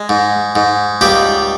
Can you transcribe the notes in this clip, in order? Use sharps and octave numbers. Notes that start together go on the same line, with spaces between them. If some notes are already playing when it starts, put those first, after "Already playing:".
Already playing: G#3
G#2
G#2
C#2 G3 G4